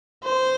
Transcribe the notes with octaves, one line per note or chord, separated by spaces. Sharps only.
C5